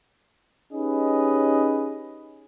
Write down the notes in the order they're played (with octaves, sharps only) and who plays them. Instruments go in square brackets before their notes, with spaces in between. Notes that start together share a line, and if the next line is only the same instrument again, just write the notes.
[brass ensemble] C#4 D#4 G4 G#4 B4 D#5